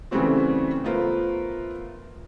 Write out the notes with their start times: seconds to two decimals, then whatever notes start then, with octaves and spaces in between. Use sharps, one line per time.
0.11 C#3 E3 G3 A3 C4 F#4
0.84 A3 B3 F4 A#4 C5